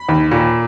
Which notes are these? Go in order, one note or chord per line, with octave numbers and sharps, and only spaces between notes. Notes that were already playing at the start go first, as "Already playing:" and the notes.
Already playing: B5
D#2
A#2